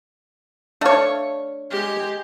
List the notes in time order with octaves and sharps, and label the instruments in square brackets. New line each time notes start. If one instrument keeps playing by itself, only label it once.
[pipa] A3 C#5 [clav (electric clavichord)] D4 F5
[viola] G#3 G4